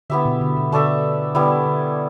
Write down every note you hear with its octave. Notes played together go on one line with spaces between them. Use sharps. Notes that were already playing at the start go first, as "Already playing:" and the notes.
D3 B3 E4 G4 E5
B2
D3
B2
D3 A3 D4 A4 E5
D3 G3 B3 E4
D3